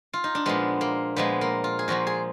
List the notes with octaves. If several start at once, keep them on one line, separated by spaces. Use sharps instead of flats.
F4
D#4
D4
A#2 F3 G#3 B3
A#3
A#2 F3 G#3 B3
A#3
F4
G#4
A#2 F3 G#3 F#4
G#4